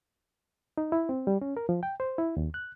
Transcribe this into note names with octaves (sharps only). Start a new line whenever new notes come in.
D#4
E4
C4
G3
C#4
A#4
F3
G5
C5
E4
D#2
F#6